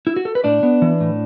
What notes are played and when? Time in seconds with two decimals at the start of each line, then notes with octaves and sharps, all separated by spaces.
0.07 E4
0.16 F#4
0.25 A4
0.35 B4
0.44 A2 D4 D5
0.63 B3
0.82 E3
1.00 A2